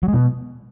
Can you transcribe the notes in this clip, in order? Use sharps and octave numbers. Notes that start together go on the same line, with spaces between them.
F#3
G#3
B2